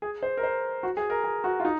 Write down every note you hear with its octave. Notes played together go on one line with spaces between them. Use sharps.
G#4
C5
A#4
C5
F#4
G#4
A#4
G#4
F#4
F4
D#4